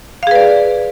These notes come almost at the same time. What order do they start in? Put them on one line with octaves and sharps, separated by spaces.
F5 G#4 B4 D5